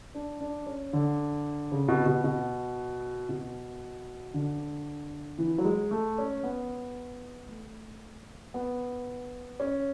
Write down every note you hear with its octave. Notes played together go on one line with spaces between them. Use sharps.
D4
D4
C#4
D3
C#3
B2
B2
B2
B2
D3
E3
F#3
G#3
A3
C#4
B3
A3
B3
C#4